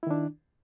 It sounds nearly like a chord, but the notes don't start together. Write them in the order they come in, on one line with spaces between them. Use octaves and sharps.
E4 D#3 D4